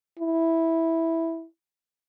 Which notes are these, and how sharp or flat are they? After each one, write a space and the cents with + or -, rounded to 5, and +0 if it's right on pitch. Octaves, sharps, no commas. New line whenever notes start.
E4 -5